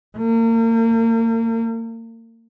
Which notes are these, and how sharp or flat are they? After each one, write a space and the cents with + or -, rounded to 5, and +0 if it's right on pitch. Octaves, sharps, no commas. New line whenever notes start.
A#3 -35